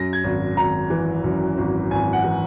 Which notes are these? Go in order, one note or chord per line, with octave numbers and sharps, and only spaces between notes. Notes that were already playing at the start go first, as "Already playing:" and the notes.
Already playing: F#2 A#6
G#6
G#1
G#1 A#5
E3
F#2
G#1
G#1 G#5
F#5
E3